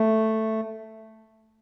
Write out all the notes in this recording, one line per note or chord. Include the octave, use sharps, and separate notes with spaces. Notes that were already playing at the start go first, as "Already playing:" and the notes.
Already playing: A3